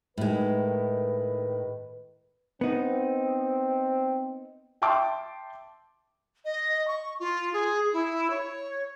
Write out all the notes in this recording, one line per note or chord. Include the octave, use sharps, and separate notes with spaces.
A2 D#3 G#3 B4
B3 C4 D#4
E5 G5 A5 C6 D6
D#5
C#6
F4
G#4
E4
C#5